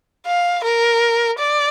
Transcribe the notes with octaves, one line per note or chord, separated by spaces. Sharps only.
F5
A#4
D5